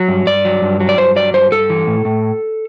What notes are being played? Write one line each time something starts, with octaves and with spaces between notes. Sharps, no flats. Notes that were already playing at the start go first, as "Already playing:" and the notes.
Already playing: F#3
G2
G2 D5
F#3
G2
F#3
D5
G2 C5
F#3 D5
G2 C5
G2 A4
E3
A2
A2